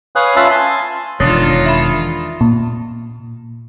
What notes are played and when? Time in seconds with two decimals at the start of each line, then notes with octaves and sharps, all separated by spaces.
0.16 B4 C#5 F5 G#5 D#6 F#6
0.36 C#4 F4 E5 F5 A5 B5
0.51 G#5 A5 C6
1.20 E1 D#3 D4 F4 C#5 D#5 A6 C7
1.66 E5 B5
2.41 A#2